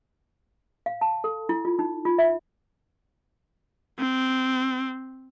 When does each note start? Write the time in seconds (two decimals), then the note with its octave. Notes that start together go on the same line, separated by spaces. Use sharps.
0.86 F5
1.01 A5
1.24 A4
1.49 E4
1.65 F4
1.79 D#4
2.05 F4
2.18 E5
3.99 C4